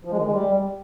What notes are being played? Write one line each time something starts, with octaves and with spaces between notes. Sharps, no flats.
F3
G#3
D#3
G#3
G3